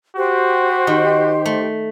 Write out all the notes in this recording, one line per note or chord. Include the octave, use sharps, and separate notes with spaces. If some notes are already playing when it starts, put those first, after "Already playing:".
F#4 G4 C5
D#3
A3